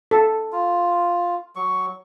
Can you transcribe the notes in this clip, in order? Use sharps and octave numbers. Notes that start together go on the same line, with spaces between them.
A4
F4
F#3 C#6